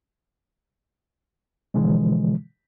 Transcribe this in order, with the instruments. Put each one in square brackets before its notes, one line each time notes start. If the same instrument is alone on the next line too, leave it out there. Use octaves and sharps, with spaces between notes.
[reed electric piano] B2 D3 E3 F3 G#3